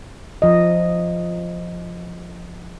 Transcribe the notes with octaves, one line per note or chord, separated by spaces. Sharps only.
F3 D#5